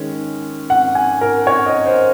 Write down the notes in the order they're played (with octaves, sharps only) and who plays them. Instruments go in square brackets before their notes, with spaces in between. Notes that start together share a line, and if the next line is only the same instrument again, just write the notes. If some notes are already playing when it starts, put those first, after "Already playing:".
Already playing: [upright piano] D#3 G#3 C#4
F#5
G#5
A#4
C#5
D#5
C5